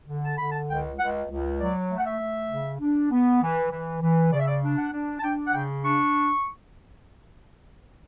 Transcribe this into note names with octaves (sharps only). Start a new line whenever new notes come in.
D3
A5
D3 B5
A5
C#2 G5
C#2 F#5
C#2
F#3 D5
A3
F#5
E5
A3
C#3
D4
B3
E3
E3
E3
C#3 D5
E5
D5
D4
F#5
D4
A5
D4 G5
F#5
C#3 G5
D4 C#6